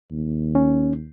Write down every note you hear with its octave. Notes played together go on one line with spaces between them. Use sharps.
D#2
C#4